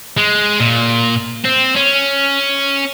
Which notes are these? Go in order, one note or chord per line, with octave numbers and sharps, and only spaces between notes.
G#3
A#2
C4
C#4